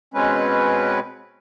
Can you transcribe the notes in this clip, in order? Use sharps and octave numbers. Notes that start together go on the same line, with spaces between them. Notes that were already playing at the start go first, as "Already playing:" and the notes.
B2 G#3 C4 C#4 B4